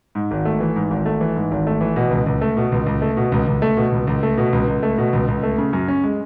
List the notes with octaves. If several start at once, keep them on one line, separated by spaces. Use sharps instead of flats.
G#2
G#1
A3
E3
G#2
G#1
A3
E3
G#2
G#1
A3
E3
B2
C#2
C#2
A3
B2
C#2
C#2
A3
B2
C#2
C#2
A3
B2
C#2
C#2
A3
B2
C#2
C#2
A3
B2
C#2
C#2
A3
C#3
F#2
C#4
G#3